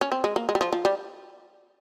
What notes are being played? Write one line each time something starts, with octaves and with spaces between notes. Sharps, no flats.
C#4
C4
G#3
A#3
G#3
G3
F3
F3
G3